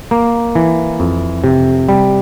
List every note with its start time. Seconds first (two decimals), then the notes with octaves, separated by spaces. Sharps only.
0.11 A#3
0.55 E3
1.00 F2
1.44 C3
1.89 G3